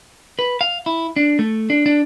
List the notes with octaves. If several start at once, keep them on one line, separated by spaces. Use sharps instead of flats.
B4
F5
E4
D4
A3
D4
D4